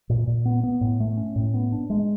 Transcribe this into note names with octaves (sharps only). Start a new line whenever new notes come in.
A#2
A#2
B3
B3
A2
A3
C#4
A2
B3
D4
G#3